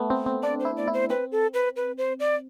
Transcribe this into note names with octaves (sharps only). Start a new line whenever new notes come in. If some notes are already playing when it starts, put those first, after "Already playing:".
Already playing: A3 B3
C4
C4
D4 D5
C5
E4
D5
E4
C5
C4 B4
A4
B4
B4
C5
D5